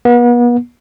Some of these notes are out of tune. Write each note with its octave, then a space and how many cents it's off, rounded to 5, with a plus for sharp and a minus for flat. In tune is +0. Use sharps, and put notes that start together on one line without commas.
B3 -40